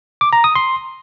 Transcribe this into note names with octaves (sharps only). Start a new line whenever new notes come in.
D6
A#5
D#6
C6